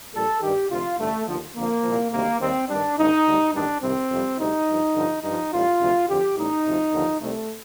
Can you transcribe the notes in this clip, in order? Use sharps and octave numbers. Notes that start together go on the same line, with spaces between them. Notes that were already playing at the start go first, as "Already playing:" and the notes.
A#1 A#2 G3 A4
G2 D#3 G3 G4
D2 C3 F3 F4
A1 G2 D3 A3
D#2 D3 F3
F2 D3 F3 A#3
C2 A#2 F3
D2 C3 D#3 G3 A#3
D#2 D#3 G3 C4
G2 D#3 G3 D4
A1 G2 D3 D#4
D2 D3 G3
A1 G2 D#3 G3 D4
C2 C3 D#3 G3 C4
F2 C3 G3
D2 C3 G3 D#4
G2 F3
G2 D3 F3
G2 F3 D#4
A1 A2 G3 F4
D2 C3 F3
F2 D3 F3 G4
A1 A2 G3 D#4
D2 C3 F3
D#2 D3 F3
C2 C3 G3 A3